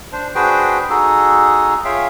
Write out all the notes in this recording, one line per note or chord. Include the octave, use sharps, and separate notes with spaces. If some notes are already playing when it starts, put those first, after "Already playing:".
D4 C5
D4 F#4 G#4 B4 C5 G5
D#4 F#4 G#4 A4
F4 G#4 C#5 E5 F5 G5